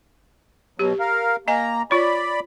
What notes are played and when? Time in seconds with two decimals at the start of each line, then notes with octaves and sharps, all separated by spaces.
0.79 B2 F#3 G4
1.00 A#4 F5
1.48 A#3 D#5 G#5 A#5
1.91 F4 C#5 D5 B5